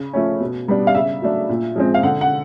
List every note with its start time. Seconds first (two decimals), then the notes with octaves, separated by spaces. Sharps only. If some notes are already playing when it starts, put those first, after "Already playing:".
Already playing: C#3
0.13 F3 A3 C#4
0.40 B2
0.68 G3 B3 D4
0.87 F5
0.95 C#3 E5
1.22 F#3 A3 D4
1.49 A#2
1.76 F3 G#3 C4
1.94 F5
2.03 D3 F#5
2.21 F#5